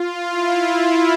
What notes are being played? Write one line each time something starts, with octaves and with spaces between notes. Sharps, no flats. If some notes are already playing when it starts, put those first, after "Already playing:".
Already playing: F4
E4